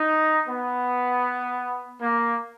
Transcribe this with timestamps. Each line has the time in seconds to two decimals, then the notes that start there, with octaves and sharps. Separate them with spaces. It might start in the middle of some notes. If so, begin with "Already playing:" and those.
Already playing: D#4
0.48 B3
2.02 A#3